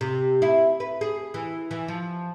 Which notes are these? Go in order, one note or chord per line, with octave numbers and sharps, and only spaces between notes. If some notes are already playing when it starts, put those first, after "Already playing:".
C3
E4
B4
G#4
E3
E3
F3